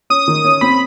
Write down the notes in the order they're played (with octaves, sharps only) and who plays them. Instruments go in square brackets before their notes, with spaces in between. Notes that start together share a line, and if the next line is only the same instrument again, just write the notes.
[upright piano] C#4 [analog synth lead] D#6
[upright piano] D#3
C#4
[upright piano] C4 [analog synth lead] B5